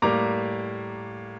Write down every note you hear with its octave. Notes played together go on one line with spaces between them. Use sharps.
A2 G3 A#3 A#5 D6